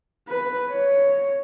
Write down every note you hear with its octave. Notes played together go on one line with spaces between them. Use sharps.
B4
C#5